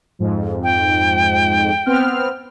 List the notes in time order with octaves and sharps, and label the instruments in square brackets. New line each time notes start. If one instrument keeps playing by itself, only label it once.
[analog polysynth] F2 G#2
[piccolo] G5
[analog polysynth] B3 C4 F6